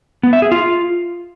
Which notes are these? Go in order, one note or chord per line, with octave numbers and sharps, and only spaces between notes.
B3
E5
G#4
F4